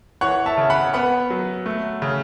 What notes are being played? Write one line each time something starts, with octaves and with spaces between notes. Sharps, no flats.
E3 C#5 F#5
E5 A5
C#3
F#5 B5
B3 F#5 B5
F#3
A3
C#3